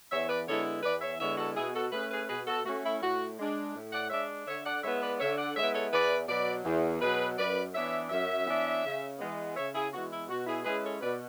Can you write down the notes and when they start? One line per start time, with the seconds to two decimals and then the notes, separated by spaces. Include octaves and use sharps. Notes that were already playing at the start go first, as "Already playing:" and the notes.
0.11 E2 C#5 E5
0.29 B4 D5
0.46 D3 G#3 B3 E4 A4 C#5
0.83 E2 B4 D5
1.02 C#5 E5
1.19 D3 G#3 B3 E4 C#5 E5
1.37 F#4 A4
1.56 B2 E4 G#4
1.74 F#4 A4
1.92 A3 C#4 G#4 B4
2.11 G#4 B4
2.29 B2 G#4 B4
2.47 F#4 A4
2.65 A3 C#4 F#4
2.84 E4
3.02 A2 F#4
3.38 G#3 D4
3.74 A2
3.92 D5 F#5
4.10 G#3 D4 C#5 E5
4.47 D3 C#5 E5
4.65 D5 F#5
4.83 G#3 B3 E4 C#5 E5
5.01 B4 D5
5.19 D3 C#5 E5
5.37 D5 F#5
5.56 G#3 B3 E4 C#5 E5
5.74 A4 C#5
5.92 E2 B4 D5
6.28 B2 F#3 B4 D5
6.65 E2
7.01 B2 F#3 G#4 B4
7.37 F#2 B4 D5
7.74 E3 B3 D4 C#5 E5
8.10 F#2 C#5 E5
8.47 E3 B3 D4
8.83 C#3
9.19 E3 G#3 B3
9.56 C#3 C#5 E5
9.73 E4 G#4
9.92 E3 G#3 B3 F#4
10.10 E4
10.28 B2 F#4
10.46 E4 G#4
10.65 G#3 C#4 E4 G#4 B4
10.83 A4 C#5
11.01 B2 B4 D5